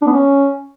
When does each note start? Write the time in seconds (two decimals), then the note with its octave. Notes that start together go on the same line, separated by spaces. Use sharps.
0.02 D4
0.07 B3
0.12 C#4